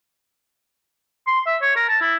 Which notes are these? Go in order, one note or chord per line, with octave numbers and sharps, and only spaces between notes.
C6
E5
C#5
A#4
A5
E4